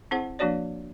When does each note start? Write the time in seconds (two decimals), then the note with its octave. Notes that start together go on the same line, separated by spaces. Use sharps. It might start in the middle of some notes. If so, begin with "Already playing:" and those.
0.11 C4 E4 G#4 C5 F#5
0.39 F3 A#3 D4 F#4 C#5 D5